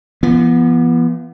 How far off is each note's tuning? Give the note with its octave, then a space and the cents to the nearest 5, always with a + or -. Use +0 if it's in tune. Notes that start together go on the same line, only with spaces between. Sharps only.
F3 -45 B3 -20